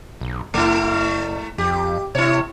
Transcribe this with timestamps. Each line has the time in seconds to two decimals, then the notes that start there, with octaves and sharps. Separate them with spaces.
0.21 B1
0.54 F#1 A3 E4
1.58 F2 G4
2.15 C3 E4 C#5